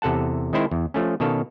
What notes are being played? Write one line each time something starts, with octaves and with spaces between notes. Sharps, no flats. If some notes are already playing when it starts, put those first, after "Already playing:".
E2 C3 A4 F#5 A5
D#3 G#3 C4 E4 C5
E2
F3 A3 C#4
B2 D#3 C#4 A4 F5